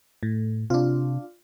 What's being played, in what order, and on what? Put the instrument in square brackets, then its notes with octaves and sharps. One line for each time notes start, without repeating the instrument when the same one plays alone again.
[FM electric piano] A2
[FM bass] C3 [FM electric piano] D4 F4